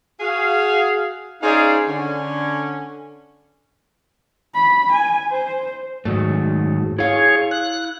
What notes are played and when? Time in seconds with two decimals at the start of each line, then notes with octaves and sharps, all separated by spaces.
0.20 F#4 G#4 F5
1.41 C#4 D#4 G#4 C5 D5 F5
1.88 D3 C#4
4.54 B5
4.92 G#5
5.31 C5
6.05 G#2 D#3 F#3 A3
6.98 E4 G#4 C#5 F5
7.51 F#6